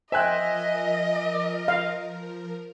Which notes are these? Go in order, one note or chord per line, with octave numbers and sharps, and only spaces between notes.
F3 A#4 C5 D#5 E5 G5 G#5 F#6
F5